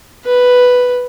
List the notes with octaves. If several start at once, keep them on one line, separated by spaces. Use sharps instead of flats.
B4